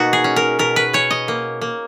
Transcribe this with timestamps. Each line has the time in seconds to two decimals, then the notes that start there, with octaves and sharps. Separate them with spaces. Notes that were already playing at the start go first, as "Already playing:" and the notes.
Already playing: B2 A#3 D#4 F#4
0.13 G#4
0.24 C#4
0.36 A#4
0.59 B2 A#4
0.76 B4
0.93 C#4 C#5
1.11 D#5
1.28 A#3
1.61 A#3